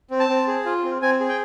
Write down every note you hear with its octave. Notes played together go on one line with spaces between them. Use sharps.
C4
A5
C4
G#4
F4
C4
C4 G#5
G#4
G5